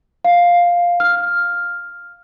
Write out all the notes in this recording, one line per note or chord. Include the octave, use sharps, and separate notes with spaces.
F5
F6